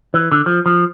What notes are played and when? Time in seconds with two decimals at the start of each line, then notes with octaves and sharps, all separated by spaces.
0.14 E3
0.32 D3
0.46 F3
0.66 F3